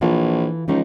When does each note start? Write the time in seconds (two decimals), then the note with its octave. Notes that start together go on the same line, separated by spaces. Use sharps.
0.01 A#1 E3 F4 A4
0.68 C#2 F3 C#4 D#4